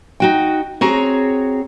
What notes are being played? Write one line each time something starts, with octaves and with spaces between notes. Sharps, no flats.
D#4 F#4 G5
C4 F#4 G#4 C#5 A#5